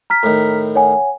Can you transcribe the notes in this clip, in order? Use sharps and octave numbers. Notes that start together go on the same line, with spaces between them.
A#5 F6 B6
A2 D#3
C#5 F#5 G#5